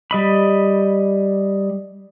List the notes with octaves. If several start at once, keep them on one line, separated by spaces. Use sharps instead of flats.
G3 D#5 B5